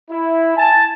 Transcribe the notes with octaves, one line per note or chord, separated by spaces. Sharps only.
E4
G#5 A5